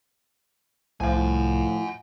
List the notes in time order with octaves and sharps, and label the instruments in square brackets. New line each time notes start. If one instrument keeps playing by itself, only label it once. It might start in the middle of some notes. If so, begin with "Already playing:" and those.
[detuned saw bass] C2 [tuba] A2 [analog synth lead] F3 [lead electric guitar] F#5 G#5